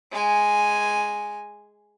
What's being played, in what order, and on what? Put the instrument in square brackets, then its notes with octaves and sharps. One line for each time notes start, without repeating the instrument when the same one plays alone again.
[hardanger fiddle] G#3 G#5